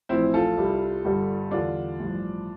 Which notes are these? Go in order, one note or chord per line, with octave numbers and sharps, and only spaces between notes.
A1 A2 F3 C4 E4
F4 A4
C2 C3 G3
G1 G2 D3 G3
E2 D3 G3 D4 F4
A1 G2 F3